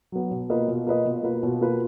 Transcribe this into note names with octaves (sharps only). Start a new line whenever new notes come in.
F#3 B3
B2
A#3 F4 B4 D#5
B2
A#3 F4 B4 D#5
B2
A#3 F4 B4
B2
A#3 F4 B4